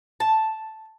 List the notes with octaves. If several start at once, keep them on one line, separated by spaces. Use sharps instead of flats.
A5